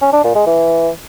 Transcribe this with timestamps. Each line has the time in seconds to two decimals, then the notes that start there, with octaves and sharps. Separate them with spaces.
0.02 C#4
0.13 D4
0.24 A#2
0.35 G#3
0.46 E3